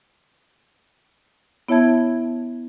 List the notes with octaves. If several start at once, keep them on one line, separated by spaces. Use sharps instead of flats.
B3 E4 C#5 E5 A5 G#6